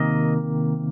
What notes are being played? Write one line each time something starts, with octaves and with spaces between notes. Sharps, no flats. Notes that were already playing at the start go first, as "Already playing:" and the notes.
Already playing: C3 D#3 A#3 D#5